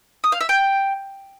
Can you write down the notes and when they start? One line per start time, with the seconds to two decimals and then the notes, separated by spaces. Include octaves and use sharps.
0.24 D#6
0.32 F5
0.41 E5
0.49 G5